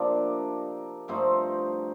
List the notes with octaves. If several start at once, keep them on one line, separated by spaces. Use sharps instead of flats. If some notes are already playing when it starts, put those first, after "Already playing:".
Already playing: C3 F3 A#3 D4 D#4 D5
G2 F3 A3 C4 D#4 C5